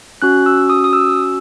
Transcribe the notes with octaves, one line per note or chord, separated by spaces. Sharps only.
C#4 F#4 F#6
E6
D#6
D#6
E6